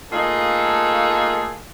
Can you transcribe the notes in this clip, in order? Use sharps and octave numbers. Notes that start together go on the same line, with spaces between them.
A3 A#3 D#4 F4 G#4 A4